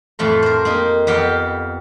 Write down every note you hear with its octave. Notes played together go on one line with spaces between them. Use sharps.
F2 A2 F3 A3 B5 C6
A#4 C5
A#3 D#4 G4
F2 B3 G4 F5 G5